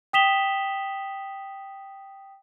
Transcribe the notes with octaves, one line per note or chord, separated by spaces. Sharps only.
G5 D#6 B6 E7 F7 G7